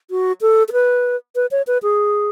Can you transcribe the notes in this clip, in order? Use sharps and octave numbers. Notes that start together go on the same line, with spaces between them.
F#4
A4
A4
B4
B4
C#5
B4
G#4